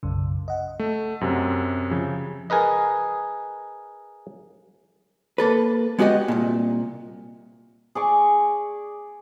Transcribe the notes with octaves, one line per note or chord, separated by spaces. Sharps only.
B1 F#2 C#3
D#5 F#5
A3
F#2 C3
C#3 F3
G#4 A#4 B4 D#5
A#3 A4 B4
G#3 B3 F#4 G4 D#5
C2 A#2
G#4 D5 C#6